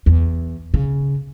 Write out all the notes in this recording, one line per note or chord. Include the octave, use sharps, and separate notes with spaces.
E2
C#3